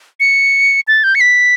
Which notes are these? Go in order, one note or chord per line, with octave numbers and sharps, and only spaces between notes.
C#7
A6
G6
C#7
B6